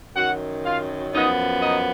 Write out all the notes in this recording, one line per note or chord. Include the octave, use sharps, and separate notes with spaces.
F#2 D#3 F#3 F#4 F#5
F4 F5
F#2 F3 B3 D#4 D#5
D#4 D#5